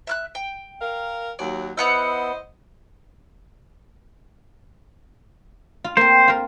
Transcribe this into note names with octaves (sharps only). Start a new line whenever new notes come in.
E5 F6 F#6
G5
A#4 F5
D#2 F#3 D5
B3 E4 C5 D#5 F#5 E6
F4
A#3 C4 C5
F4 A#4